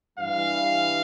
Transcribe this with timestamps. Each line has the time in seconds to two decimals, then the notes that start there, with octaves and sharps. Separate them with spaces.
0.19 G2 E3 G3 F5